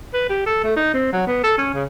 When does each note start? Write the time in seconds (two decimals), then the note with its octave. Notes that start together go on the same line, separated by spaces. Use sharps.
0.14 B4
0.29 G4
0.46 A4
0.64 A3
0.76 D#4
0.94 C4
1.13 F#3
1.27 B3
1.44 A4
1.58 C#4
1.74 C#3